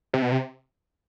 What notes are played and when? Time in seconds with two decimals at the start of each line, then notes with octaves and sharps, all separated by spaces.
0.14 C3
0.22 B2
0.32 C3